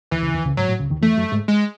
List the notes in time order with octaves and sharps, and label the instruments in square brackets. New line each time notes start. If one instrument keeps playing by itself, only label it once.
[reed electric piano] D#2 D#3 [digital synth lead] E3
[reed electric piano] C#2 C#3
D#2 D#3
C#2 C#3
[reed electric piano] G#2 [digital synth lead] F#3
[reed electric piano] A2
C#2 C#3
D#2 D#3
[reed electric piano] E2 E3 [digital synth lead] A3
[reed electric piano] F#2 F#3
G#2 G#3
[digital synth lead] G#3